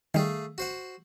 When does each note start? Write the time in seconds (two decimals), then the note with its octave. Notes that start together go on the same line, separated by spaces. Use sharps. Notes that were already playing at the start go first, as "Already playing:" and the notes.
0.14 D#3 G3 A3 G#4 F5
0.58 F#4 C5 F#5